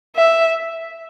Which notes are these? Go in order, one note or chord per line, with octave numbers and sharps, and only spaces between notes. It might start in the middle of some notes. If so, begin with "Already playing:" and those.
E5